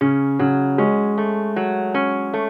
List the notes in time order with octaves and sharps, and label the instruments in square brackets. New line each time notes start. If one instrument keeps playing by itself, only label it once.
[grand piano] C#3 [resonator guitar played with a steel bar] C#4
[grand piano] C#3 [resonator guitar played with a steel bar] F#3
[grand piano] G#3 [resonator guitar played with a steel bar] C#4
[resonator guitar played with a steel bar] A3
F#3
C#4
A3